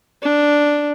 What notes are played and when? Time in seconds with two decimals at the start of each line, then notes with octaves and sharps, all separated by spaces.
0.22 D4